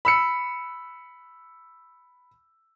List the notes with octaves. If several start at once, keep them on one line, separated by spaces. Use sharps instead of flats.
B5 E6 C#7